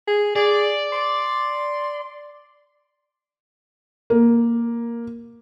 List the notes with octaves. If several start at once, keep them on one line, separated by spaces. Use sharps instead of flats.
G#4
G#4 D5
C6
A#3